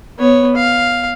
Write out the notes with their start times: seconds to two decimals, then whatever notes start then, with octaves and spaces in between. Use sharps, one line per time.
0.19 B3 C#5
0.56 F5